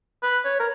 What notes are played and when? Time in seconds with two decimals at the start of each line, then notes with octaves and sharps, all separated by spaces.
0.23 B4
0.45 C#5
0.60 A#4